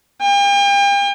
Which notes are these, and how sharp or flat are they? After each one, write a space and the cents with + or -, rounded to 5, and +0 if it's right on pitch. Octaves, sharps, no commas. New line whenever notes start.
G5 +40